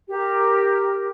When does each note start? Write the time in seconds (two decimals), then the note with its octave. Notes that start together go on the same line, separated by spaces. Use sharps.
0.09 G4 A#4